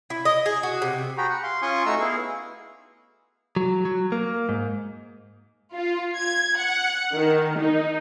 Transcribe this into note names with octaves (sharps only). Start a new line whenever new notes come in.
E4
D#5
G#4
F#4
C3
F#4 G#4 G5 A#5 B5
F#5
F5 C6
C#4 F4 G#5 C6 C#6 D#6
A3 D#4 F#4 A#5 C#6 E6
B3 E4 G#4 F5
F#3
F#3
A#3
G#2
F4
G#6
F#5
D#3
D#4